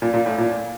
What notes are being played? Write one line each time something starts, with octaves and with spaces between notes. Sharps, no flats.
A#2
A#2
A2
A#2